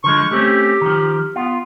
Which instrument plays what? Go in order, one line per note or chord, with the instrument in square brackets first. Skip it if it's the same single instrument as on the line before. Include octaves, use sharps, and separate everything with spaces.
[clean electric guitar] D3 F3 G#3 [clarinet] C#6
[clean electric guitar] A3 C4 C#4 [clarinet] G4
[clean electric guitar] D#3 F3
[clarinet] B3 [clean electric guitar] F4